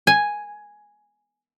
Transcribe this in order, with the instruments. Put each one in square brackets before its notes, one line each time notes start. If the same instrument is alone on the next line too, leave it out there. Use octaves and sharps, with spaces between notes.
[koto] G#5